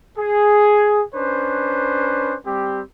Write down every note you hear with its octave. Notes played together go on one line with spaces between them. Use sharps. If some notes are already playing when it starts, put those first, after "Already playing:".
G#4
C#4 D4 B4 C5
G3 C4 G4